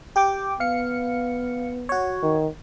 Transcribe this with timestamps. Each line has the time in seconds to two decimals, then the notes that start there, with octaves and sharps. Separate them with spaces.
0.16 G4 G5 D6
0.60 B3 F5 C#7
1.89 F#4 C#5
2.22 D#3